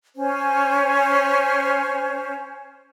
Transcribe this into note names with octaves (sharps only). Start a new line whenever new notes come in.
C#4 C5